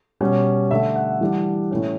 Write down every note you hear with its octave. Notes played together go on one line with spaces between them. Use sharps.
B2 G3 C#4
D3 A3 D4 E5
F#5
E3 G3 D4
A2 E3 A3 C#4